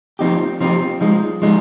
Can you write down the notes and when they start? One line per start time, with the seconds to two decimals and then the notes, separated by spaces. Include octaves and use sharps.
0.19 F3 C4 D#4 G4
0.61 F3 C4 D#4 G4
1.01 F3 G#3 D#4
1.42 F3 G#3 D#4